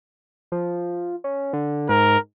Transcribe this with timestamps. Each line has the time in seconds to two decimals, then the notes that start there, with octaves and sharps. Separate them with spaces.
0.52 F3
1.24 C#4
1.53 D3
1.89 G#2 A#4